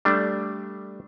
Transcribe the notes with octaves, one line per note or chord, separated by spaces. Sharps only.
G3 A3 D4